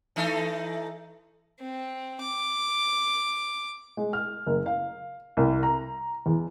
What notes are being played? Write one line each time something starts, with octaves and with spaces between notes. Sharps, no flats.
E3 A3 D#4
C4
D6
G#3
F6
F#1
F5
C2
A#5
E2